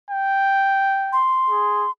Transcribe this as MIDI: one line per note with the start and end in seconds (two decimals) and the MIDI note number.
0.11 1.22 79
1.13 1.91 84
1.50 1.87 68